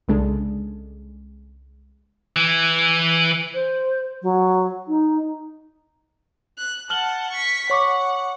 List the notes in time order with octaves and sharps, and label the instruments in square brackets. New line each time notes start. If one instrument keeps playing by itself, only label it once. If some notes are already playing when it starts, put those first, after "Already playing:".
[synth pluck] C2 C#3 G#3 D4 A4
[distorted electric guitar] E3
[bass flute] C5
F#3
D#4
[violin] F#6
[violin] F#5 A5 [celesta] F6 F#7 G7
[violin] C#6 B6
[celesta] C#5 C#6 D6 [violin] F#5